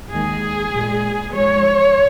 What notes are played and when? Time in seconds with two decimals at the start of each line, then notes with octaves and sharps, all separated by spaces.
0.13 D#2 D#3 G#3 G#4
0.74 A#2 G#3
1.35 G#2 F3 G#3 C#5